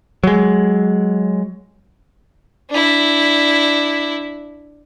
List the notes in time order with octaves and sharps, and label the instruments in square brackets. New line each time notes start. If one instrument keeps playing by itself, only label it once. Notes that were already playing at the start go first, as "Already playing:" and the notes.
[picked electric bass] F#3 G#3
[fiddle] D4 E4